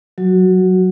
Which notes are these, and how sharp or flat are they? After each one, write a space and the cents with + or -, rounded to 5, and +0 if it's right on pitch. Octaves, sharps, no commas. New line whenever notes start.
F#3 +0 F#4 +0